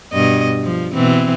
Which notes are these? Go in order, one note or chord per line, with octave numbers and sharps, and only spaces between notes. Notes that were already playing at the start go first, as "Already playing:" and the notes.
G2 B2 D#5
F3
B2 E3 C4